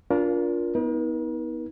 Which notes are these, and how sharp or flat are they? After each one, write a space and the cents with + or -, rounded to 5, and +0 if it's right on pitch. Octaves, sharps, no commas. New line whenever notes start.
D4 -30 F4 +0 A#4 +20
B3 +0 D#4 +40 A#4 +45